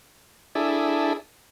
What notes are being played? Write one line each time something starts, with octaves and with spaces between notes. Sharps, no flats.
D4 E4 G#4 A4